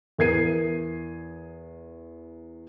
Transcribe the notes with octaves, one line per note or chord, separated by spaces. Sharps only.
E2 A#4 G#6 C7 D#7